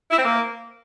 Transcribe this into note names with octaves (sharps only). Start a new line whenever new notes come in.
E4
C4
A#3